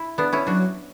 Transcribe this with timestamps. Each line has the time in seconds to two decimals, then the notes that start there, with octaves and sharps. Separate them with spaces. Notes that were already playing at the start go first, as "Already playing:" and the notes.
Already playing: E4
0.18 B3 D4
0.33 C#4 E4
0.47 F#3 D4 F#4